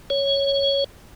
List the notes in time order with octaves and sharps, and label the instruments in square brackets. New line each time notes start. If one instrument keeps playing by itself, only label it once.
[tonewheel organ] C#5